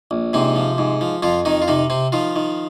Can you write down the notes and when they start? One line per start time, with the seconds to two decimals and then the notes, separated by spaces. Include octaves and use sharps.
0.11 A#1
0.33 G#2 C3 C4
0.56 F3
0.78 G#2
1.01 F3
1.23 F2 F3 F4
1.45 F2 D#3 D#4
1.62 F4
1.68 C3 D#3 D#4
1.90 C3 C4
2.12 D#3 F3 F4
2.36 D#3